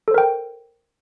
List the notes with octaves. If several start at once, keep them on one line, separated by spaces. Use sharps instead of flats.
A4 A#4 C5 G5